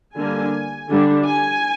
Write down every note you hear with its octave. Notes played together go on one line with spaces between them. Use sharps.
D3 G3 A#3 D4 G#5
D3 G3 D4
G#5